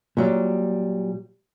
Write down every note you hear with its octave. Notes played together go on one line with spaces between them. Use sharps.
A#2 F#3 G3